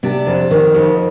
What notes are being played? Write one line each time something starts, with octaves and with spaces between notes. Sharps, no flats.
C3 D4
F2
D#3
F2